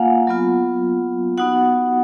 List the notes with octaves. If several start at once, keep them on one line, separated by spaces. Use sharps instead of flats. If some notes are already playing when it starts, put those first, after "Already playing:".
Already playing: A#3 F4 F5 F#5 G#5
F#3 B3 F4
B3 D#4 F#4 F#5